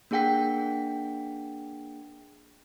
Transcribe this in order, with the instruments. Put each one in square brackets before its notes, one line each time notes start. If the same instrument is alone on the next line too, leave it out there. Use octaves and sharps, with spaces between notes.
[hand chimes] A#3 D4 G#4 F#5 G5 B6